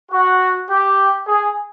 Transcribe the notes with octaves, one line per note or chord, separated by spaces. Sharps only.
F#4
G4
G#4